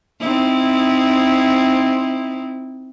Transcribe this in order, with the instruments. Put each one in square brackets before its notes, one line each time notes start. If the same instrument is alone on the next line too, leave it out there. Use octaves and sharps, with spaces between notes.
[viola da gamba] C4 D#4 E4